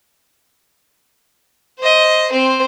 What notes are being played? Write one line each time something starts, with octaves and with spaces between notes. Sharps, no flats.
C5 D#5
C4 C5